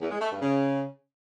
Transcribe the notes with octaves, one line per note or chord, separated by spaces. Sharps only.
E2
G#3
A3
G2
C#3